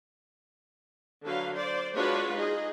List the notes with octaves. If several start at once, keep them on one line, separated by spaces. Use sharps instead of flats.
D3 F#3 B4 F5
C5 D5
G#3 D4 F4 F#4 B4 C#5
D#4 G#4 D#5